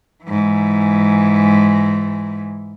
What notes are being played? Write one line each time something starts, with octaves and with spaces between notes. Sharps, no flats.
G#2 E3